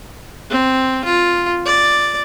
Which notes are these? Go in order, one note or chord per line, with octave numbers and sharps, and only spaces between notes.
C4
F4
D5